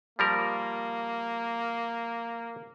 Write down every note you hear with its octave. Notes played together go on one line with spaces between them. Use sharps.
F3 G3 A#3 A#4